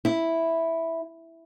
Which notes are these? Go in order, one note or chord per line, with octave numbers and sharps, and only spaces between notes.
E4